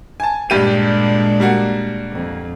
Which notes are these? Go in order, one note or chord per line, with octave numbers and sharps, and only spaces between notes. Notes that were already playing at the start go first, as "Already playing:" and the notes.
G#5 A5
G2 A#2 G#3 D4 G4 D#7
G3 A#3 F#4
F2